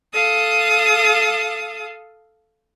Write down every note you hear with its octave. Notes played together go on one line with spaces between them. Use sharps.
A4 F5 D#6